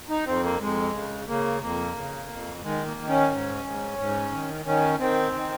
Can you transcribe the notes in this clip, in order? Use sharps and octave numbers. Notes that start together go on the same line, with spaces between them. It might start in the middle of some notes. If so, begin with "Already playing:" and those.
D#4
F2 C4
A#3
F2 G#3
C#3
C#3 A#3
F2 A#3
C#3
F2
D#3 G#3
A#3
D#3
C#4
G#2
G#2
G#2
D#3
D#3 C#4
D#3 C4
D#3